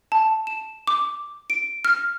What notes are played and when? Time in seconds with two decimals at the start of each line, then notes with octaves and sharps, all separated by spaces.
0.12 A5
0.47 E7
0.87 D6
1.50 D7
1.85 F6